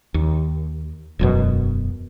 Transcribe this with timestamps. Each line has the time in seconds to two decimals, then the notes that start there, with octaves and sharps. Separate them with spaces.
0.14 D#2
1.19 E1 F#2 B2